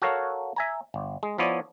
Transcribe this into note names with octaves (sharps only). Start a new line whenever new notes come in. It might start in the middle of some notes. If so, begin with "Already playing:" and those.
F#4 A4 A#4 C#5 F5
E5 G#5 A#5
G1
G#3
F3 B3 E4 C#5 D5